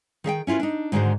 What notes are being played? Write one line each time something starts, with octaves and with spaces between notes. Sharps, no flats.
D#3 G#4 E5 G5
C#4 E4 F4 A#4 B4
D4 D#4
G#2 D3 D#3 G#3 F#4 C5